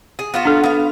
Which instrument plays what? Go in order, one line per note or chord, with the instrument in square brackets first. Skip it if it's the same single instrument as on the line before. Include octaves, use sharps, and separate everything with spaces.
[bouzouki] G#4
B3 F4 F#4
[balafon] D4 A4
[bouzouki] B3 F5